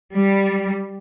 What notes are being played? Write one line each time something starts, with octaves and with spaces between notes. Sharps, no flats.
G3